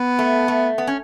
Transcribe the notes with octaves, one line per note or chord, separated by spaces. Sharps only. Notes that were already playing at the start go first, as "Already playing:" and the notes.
Already playing: B3
A3
A3
B3
C#4